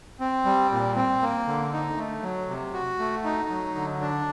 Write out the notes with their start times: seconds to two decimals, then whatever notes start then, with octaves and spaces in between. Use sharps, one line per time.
0.20 C4
0.45 G3
0.71 A#2
0.96 C4
1.22 A#3
1.47 D3
1.73 D#4
1.97 A3
2.23 F#3
2.48 C3
2.73 F#4
2.99 A3
3.24 D#4
3.49 F#3
3.75 D3
4.01 D4